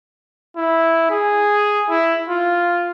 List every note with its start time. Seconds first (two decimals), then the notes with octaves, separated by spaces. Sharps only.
0.57 E4
1.11 G#4
1.90 E4
2.29 F4